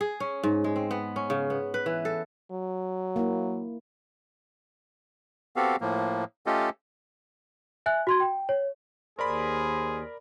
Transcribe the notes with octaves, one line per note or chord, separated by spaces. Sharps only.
G#4
C#4
G#2
G#3
C4
B3
C#4
C#3
B3
B4
E3
A4
F#3
A#3 E4
B3 C4 F#4 G4 A4 F5
A2 F3 A#3
A3 C#4 F4 G4 A4 D#5
E5 G#5 F#6
F#4 C6 G#6
G5
C#5
D#2 G#4 A#4 C5 D5 B5